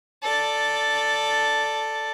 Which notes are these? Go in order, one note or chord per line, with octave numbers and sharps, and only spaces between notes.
A4 D5